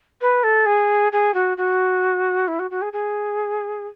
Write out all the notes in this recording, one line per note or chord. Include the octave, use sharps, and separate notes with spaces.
B4
A4
G#4
G#4
F#4
F#4
E4
F#4
F#4
G#4
G#4